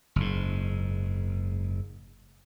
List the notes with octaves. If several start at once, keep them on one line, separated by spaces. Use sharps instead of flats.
F#1 G#2